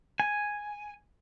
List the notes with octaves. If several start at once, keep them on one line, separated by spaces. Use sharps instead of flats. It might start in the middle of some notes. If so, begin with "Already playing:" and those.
G#5